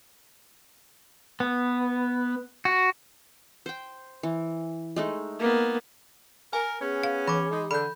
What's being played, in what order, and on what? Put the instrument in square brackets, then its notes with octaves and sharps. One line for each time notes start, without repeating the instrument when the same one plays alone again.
[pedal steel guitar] B3
F#4
[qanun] C5 G5
E3
G#3 A3 D#4
[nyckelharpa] A#3 B3
[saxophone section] A#4 [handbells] G#5
[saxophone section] B3 C#4 [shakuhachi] G#4
[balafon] F5
[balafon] E3 [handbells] B5 D6
[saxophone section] G#3 D#4
[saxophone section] D3 [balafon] A4 [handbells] B5 G6